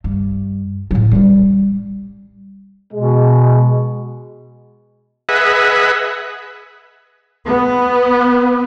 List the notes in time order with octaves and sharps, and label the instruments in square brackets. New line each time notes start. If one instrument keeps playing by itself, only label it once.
[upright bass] G2
A2 F#3
G3 C#4
[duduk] B2 [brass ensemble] G#3
[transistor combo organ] G#4 B4 D#5 E5 F#5
[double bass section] B3